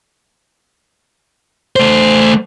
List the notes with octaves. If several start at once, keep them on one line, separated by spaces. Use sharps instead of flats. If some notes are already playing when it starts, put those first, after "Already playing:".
A3 C5